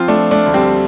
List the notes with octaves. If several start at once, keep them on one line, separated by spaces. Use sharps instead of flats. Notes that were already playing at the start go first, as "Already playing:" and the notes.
Already playing: F3 C4 F4
A3 D4
F3
A3 D4
D2
G3 C4